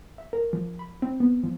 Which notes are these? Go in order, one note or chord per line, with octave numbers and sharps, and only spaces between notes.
E5
A#4
F3
B5
C4
B3
F3